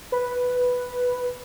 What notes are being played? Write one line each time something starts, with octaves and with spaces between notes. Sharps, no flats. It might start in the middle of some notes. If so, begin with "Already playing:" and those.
B4